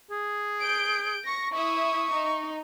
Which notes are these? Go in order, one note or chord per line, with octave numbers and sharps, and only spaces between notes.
G#4
G6 D7
C#6 A#6
E4 E5 C#6 D#6
D#4